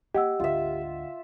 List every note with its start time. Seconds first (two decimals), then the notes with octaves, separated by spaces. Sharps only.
0.15 A#3 G4 D#5 F#5 E6
0.40 G#1 D2 F4 E5